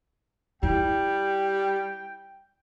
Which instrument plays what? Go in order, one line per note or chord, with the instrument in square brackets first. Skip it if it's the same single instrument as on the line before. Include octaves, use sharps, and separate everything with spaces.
[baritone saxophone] G3 [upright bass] E4 [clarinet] G5